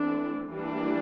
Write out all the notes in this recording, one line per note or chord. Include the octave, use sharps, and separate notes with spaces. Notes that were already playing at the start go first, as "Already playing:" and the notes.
Already playing: E3 A3 C4 D4
E3 G3 A#3 D4